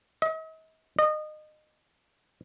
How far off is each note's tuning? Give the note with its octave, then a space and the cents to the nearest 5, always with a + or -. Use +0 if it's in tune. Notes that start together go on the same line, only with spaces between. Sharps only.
D#5 +45
D#5 -25